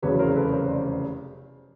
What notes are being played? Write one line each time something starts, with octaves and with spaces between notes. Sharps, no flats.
F1 E2 C#3 F#3 B4 C#5
A#4 C5
A4 B4
A#4 C5
C5 D5